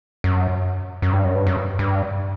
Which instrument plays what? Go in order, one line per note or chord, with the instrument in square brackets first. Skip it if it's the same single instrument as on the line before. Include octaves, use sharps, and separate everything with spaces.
[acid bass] F#2
F#2
G2
F#2
G2
F#2
G2